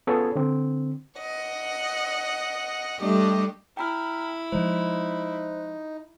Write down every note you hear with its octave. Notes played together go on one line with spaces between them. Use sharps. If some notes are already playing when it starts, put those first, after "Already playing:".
B3 C#4 F4 G#4 A4 C#5
D3 C4
D#5 F#5
G3 A3 D4 G4 D#5
E4 G5 A#5 B5 F6
F3 G#3 D#4 C5